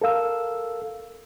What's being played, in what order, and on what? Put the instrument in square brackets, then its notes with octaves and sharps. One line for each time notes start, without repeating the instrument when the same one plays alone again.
[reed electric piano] A4 A#4 F5 E6